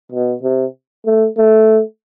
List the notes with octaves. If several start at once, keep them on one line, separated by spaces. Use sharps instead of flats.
B2
C3
A3
A3